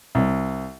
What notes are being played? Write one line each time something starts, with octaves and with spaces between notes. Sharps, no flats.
C2